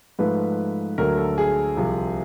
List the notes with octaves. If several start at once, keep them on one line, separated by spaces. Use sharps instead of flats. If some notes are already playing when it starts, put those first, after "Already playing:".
G#2 F3 A3 B4
D2 D3 F#3 A#4
A4
G#4
C2 C3 F3